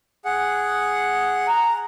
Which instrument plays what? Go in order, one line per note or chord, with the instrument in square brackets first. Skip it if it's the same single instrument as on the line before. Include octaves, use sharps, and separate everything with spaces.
[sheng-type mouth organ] G#4 F#5
[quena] A#5